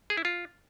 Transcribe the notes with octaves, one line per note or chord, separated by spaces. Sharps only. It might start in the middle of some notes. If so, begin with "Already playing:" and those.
G#4
E4
F4